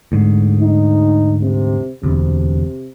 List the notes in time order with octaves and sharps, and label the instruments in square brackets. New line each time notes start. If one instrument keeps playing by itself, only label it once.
[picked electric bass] D2 G#2
[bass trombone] D#4
C3
[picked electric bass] E1 D2 [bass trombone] C3